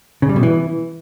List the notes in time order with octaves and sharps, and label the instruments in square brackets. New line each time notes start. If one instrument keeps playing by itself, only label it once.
[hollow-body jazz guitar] C#3
G3
B2
E3